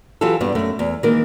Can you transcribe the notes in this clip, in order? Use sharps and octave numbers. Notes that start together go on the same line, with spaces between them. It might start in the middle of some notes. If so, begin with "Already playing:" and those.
E3 F#3 F4 G4 A4
G2 G3 B3
F#2 A3
E2
D#3 E3 G#3 A#3 A#4